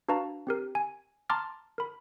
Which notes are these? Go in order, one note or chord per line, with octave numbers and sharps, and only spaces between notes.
D4 F#4 B4 F5 A5 A#5
C4 G4 A#4
G#5
A5 A#5 C6 D6 F6 A6
A#4 B5